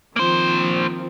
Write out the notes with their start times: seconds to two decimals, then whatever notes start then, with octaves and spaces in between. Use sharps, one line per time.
0.16 D#3 F3 A#3 C4 C5